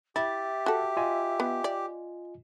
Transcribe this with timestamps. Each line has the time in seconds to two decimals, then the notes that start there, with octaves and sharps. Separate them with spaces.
0.16 E4 G4 E5 A6
0.66 F#4 A4
0.97 F4 D#5 G#5
1.40 B3
1.64 D5